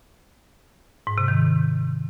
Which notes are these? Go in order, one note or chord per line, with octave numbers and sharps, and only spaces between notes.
G#2
C3
D#3